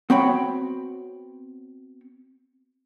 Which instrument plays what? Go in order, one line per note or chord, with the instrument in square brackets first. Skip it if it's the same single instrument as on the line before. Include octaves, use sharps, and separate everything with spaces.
[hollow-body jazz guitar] B3 C4 F#4 C#5 G5 B5